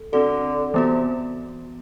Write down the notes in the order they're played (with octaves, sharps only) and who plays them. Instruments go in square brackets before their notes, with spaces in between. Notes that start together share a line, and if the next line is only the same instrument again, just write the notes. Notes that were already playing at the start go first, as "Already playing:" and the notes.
Already playing: [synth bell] A4
[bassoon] D3 [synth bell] C4 F#4 A4
[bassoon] C3 [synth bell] E3 B3 F#4